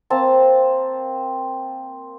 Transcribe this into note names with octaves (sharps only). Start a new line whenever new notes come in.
A#3 C4 A5